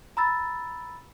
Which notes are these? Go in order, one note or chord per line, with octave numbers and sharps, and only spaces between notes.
A#5 B5 E6 A6